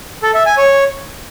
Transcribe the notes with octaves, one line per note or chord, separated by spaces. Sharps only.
A4
E5
G#5
C#5